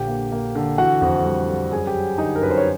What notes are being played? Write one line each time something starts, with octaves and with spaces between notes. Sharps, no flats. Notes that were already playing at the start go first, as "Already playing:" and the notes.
Already playing: A#1 D3 G4 G5
A#3
A#3
D3
E3 F#4 F#5
F2
G3
G3
F#2 G#4 G#5
G4 G5
F#3
D3 D#4 D#5
A#4
F#2 B4
C5
C#5